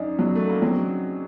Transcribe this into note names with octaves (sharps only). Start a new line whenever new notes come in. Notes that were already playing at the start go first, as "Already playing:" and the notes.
Already playing: F#2 D4 D#4
F#3
A3
A#3
F#3 C4